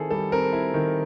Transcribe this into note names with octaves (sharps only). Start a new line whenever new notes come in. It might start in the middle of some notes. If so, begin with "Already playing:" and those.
Already playing: D#3 C4 E4 G#4 A4
G3 A4
C4 A#4
E4
D#3